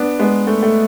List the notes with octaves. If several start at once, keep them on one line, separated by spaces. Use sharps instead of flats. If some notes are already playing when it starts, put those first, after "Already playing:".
Already playing: B3 D4
G#3 B3
A3
A3